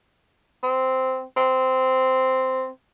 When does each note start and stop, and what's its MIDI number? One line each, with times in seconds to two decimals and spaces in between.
0.63 1.22 60
1.37 2.68 60